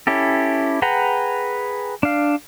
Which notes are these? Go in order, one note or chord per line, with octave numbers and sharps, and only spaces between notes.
C#4 E4 G4 A4
G#4 B4 F#5 G5 A#5
D4 F5